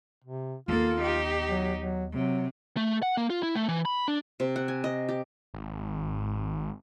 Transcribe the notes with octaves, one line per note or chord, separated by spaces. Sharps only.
C3
D#2 A#3 B3 F4 A4
D#4 G4
F#3
F#3
C3 F#3
A3
F#5
A#3
F4
E4
A3
E3
B5
D4
C3
F#5
G#5
D#5
G4
G#1